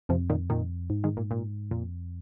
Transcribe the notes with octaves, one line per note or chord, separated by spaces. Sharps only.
F2 C3 F3
A#2 D#3
A#2 D#3
G#2
D#3 G#3
A#2
A#2
F2 A#2